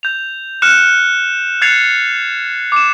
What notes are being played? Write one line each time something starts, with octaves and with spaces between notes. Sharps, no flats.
G6 F7
F6 F#6 C#7 E7
F#6 G#6 A6 C7 C#7 F7
D6 E7